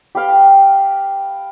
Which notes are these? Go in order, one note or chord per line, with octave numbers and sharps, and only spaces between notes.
G4 B4 F5 G5